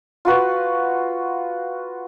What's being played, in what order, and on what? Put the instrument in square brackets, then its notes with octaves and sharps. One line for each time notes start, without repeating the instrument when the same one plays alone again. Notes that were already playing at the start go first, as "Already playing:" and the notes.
[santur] F4 F#4 B4